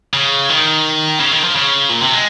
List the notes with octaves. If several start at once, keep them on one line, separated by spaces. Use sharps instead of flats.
C#3
D#3
C#3
D#3
F3
C#3
A#2
C3
G#3